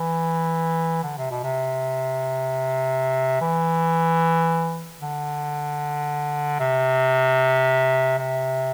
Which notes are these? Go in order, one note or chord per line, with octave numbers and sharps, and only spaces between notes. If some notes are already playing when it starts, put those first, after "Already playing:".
Already playing: E3
D3
C3
B2
C3
E3
D3
C3
C3